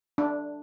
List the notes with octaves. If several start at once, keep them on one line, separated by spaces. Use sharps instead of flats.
D4